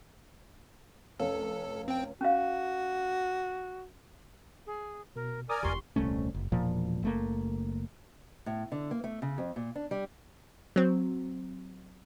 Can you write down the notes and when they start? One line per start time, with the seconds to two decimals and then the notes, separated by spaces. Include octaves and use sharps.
1.20 F1 C#4 A4 F5
1.88 C4 G5
2.21 C#4 F#4 F5
4.67 G#4
5.16 B2 A#4
5.49 A#4 D5 G#5 A#5 D6 D#6
5.63 F1 E2 G4 C6 C#6
5.96 D#1 C2 A3 C#4
6.34 F#1
6.52 E1 A#2 F3
7.03 F#1 A3 A#3
8.46 A2
8.72 D3
8.91 A#3
9.04 A3
9.22 C#3
9.38 F2
9.56 A#2
9.75 D4
9.91 G3
10.76 F#3 C4